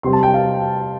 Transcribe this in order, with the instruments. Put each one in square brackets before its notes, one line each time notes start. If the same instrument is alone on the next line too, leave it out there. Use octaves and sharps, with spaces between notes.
[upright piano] C3 G3 C4 C6
A5
G5
F5